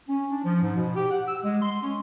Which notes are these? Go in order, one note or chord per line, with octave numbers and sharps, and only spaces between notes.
C#4
D4
F3
G#2
B2
G4
F#5
E6
G#3
C6
C#4